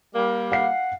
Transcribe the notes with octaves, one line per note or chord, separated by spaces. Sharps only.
G3 A#3
F5 F#5 C7